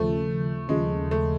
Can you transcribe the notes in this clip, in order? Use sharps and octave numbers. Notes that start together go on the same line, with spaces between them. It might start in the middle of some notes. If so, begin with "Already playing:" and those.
Already playing: D#2 C#3 F3 A3
D#2 C#3 F3 G#3
A3